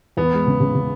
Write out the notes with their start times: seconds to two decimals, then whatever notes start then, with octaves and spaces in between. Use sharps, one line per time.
0.17 E2 B3
0.32 G#3
0.47 C#3
0.60 C#3
0.75 C#3